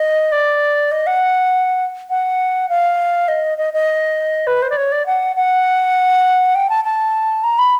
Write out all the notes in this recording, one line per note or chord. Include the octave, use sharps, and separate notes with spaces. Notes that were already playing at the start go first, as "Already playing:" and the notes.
Already playing: D#5
D5
D#5
F#5
F#5
F5
D#5
D#5
D#5
B4
C5
D5
C#5
D5
F#5
F#5
G5
A5
A5
A#5
B5